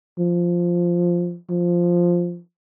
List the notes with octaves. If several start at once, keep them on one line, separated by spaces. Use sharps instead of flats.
F3
F3